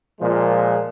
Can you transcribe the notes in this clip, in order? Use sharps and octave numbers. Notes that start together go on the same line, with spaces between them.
A#2 F3 G#3